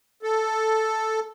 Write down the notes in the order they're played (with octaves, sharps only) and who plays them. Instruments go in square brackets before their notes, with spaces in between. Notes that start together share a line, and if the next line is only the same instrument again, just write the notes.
[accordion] A4